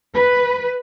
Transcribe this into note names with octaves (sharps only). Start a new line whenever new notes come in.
B4